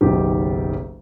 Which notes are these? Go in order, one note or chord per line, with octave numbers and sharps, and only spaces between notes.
F#1 B1 D#3 G4